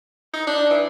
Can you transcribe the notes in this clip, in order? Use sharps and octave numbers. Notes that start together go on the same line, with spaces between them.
D#4
D4
E3